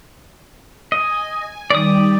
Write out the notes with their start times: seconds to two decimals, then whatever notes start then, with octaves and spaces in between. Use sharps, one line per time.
0.92 D#5 G#5
1.70 D#3 G3 G4 D5 D#6